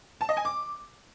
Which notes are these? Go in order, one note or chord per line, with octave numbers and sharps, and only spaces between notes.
A5
D#5
G#5
D6